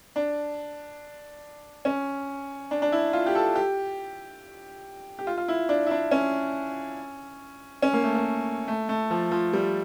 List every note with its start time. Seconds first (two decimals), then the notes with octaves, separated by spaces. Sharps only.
0.16 D4
1.85 C#4
2.71 D4
2.82 D4
2.92 E4
3.13 F4
3.26 G4
3.35 A4
3.56 G4
5.19 G4
5.27 F4
5.37 F4
5.48 E4
5.69 D4
5.86 E4
5.91 D4
6.11 C#4
7.82 C#4
7.93 A#3
8.04 A3
8.15 A#3
8.68 A3
8.89 A3
9.10 F3
9.31 F3
9.53 G3